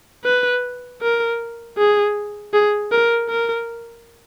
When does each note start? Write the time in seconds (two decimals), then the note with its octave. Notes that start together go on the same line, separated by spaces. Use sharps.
0.25 B4
1.02 A#4
1.78 G#4
2.53 G#4
2.92 A#4
3.29 A#4